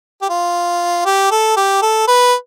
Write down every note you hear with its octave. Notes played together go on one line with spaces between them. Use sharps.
G4
F4
G4
A4
G4
A4
B4